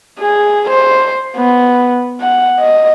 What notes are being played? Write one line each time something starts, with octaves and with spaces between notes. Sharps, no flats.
G#4
C5
B3
F#5
D#5